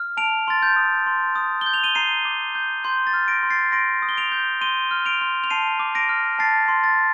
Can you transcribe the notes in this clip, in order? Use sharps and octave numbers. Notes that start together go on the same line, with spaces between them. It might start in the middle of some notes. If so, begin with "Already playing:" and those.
Already playing: F6
A5 D7 F7
C6 A6
G6
D#6
C6
D#6
G6 G7
F7
D#7 G7
A#5 C7 D#7
D6
G6
C6 G6
A6
F6
A#6 D7
C6
A6 C7
C6 A#6 D7
D#6
G7
D7 F7
G6
C6 D#7 G7
F6
D7 F7
C6
F7
A5 C7 D#7
D6
A#6 D7
F6
A5 A6 C7
C6
A6